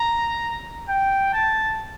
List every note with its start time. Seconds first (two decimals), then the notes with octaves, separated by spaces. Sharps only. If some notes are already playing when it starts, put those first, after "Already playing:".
Already playing: A#5
0.89 G5
1.33 A5